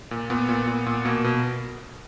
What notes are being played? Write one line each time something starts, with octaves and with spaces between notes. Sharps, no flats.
A#2
A#2 B3
A#2
A#2
A#2
B2 A#3
B2